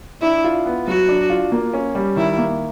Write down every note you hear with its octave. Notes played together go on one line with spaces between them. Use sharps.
D4 E4
F4
B3
F#3 F#4
D4
F4
A#3
C#4
G3
D#3 E4
A#3